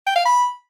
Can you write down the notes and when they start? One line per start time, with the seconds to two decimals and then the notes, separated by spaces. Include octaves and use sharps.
0.07 G5
0.16 F5
0.25 B5